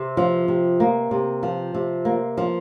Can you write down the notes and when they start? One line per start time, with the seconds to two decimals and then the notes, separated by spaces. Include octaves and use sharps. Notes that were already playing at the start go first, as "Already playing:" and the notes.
Already playing: C3
0.17 F3
0.48 C3
0.80 A#3
1.11 C3
1.43 F3
1.74 C3
2.05 A#3
2.37 F3